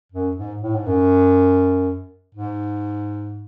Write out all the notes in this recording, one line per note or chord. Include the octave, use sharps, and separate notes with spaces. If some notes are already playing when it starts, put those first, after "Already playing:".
F#2
G#2
A2
G#2
F#2
G#2